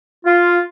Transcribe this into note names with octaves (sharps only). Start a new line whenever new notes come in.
F4